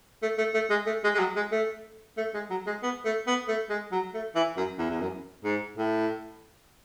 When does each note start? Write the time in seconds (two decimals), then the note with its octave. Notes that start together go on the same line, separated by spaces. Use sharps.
0.22 A3
0.38 A3
0.54 A3
0.70 G#3
0.87 A3
1.04 G#3
1.15 G#3
1.19 F#3
1.36 G#3
1.52 A3
2.17 A3
2.34 G#3
2.50 F#3
2.67 G#3
2.83 B3
3.05 A3
3.27 B3
3.48 A3
3.70 G#3
3.92 F#3
4.14 A3
4.35 E3
4.57 F#2
4.78 E2
4.90 E2
5.00 F#2
5.44 G#2
5.77 A2